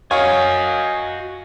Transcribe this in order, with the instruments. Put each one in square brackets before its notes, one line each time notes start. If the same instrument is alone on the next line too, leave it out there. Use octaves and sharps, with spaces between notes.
[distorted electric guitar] F#4 G#5 [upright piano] C#5 F5 [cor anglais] D#5